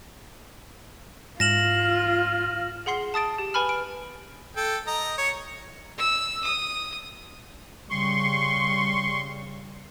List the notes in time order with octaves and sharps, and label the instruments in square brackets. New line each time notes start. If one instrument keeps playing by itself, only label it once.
[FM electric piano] G#2 [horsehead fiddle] F4 [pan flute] F6 [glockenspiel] A#6 E7 F#7
[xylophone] G#4 F#5 C6 C7 G7
A5 D#6 A6 D7
G4
B4 G#5 B5 F6
D7
[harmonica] A4 G5
D#5 A#5
C#5
[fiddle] E6
D#6
[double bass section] C#3 G3 [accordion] C6 C#6